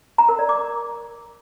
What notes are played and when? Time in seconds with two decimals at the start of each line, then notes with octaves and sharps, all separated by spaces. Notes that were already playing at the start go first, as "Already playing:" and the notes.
0.18 A#5
0.29 A#4
0.39 D5
0.49 D6